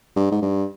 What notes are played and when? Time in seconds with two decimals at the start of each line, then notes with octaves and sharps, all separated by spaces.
0.16 G2
0.31 G#2
0.42 G2